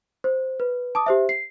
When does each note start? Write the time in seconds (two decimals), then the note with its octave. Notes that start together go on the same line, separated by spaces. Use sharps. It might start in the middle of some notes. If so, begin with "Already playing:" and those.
0.24 C5
0.60 B4
0.95 A5 D6 D#6
1.06 G4 C5 E5
1.29 C7